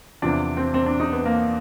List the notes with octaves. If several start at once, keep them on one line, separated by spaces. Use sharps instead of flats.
E2 C3 F3 D4
C4
C4
D4
D#4
B3
A#3